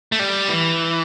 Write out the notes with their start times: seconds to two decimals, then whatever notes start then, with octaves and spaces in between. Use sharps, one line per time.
0.12 A3
0.19 G3
0.49 E3